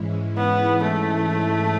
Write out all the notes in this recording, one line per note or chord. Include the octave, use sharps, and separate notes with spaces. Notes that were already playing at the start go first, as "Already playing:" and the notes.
Already playing: G#2 E3 G#3 C#4 E4
B3
A3